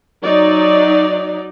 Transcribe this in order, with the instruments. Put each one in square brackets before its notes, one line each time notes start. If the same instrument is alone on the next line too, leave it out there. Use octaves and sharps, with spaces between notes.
[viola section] F#3 D#4 D5